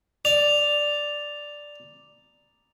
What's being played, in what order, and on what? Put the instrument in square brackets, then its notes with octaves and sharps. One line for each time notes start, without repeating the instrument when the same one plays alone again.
[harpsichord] D5 [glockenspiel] F7